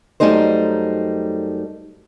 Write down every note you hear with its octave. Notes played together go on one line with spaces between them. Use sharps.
F#2 A#2 G3 A3 D#4 C5